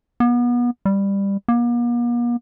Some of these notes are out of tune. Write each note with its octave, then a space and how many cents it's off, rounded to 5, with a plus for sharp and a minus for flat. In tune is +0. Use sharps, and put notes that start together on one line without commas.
B3 -30
G3 +15
A#3 +45